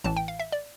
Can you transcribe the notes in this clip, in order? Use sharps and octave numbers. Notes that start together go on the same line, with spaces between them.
A1 A2 E3 A5
G5
F5
E5
D5